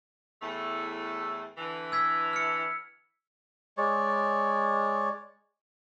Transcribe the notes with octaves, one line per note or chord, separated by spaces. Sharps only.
E2 A2 A3
D3 E3
E6 G#6 B6
F6 C#7
G#3 C#5 D5